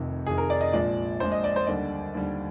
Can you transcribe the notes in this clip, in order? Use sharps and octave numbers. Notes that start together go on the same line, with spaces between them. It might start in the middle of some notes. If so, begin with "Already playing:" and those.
Already playing: F1 F2 C3 D#3
F1 F2 C3 D#3 G#4
A#4
D5
D#5
A#1 A#2 F3 G#3 D5
A#1 A#2 F3 G#3 C5
D#5
D5
C5
D#2 D3 G3 D5
D#2 D3 G3